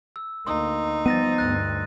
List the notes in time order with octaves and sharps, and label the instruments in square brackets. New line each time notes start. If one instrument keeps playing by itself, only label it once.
[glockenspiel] E6
[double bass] D2 A#3 [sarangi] D#4 [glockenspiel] C6 D#6 E6
[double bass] F3 G3 [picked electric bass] B3 [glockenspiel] A6 A#6 D#7
[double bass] D2 G2 [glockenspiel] F#6 A6